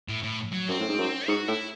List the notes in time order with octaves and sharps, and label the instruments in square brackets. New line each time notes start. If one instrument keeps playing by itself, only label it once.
[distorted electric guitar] A2
A2
F#3
[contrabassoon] F#2 [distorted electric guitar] C4
[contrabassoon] A2
G#2
F#2
[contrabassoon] G#2 [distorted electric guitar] F#4
[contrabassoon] A2 [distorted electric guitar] E4